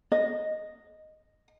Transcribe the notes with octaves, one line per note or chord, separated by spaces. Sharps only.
D#5